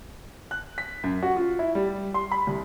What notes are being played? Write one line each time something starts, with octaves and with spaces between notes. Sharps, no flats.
F#6
B6
F#2
F#4
F4
E4
G3
C6
B5
C2